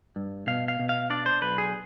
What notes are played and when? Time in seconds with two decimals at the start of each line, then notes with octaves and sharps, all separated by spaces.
0.16 G2
0.47 B2 F5
0.68 F5
0.79 B2
0.89 F5
1.10 D4 D5
1.26 C5
1.42 B1 B4
1.58 G#4